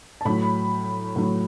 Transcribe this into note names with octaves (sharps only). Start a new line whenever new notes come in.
A5
A2 F#3 B5
A2 F#3